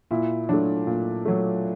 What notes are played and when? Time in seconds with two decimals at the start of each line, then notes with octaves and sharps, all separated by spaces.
0.11 A#2 E4
0.49 F#3 A3 D4
0.87 A#2
1.25 F#3 A3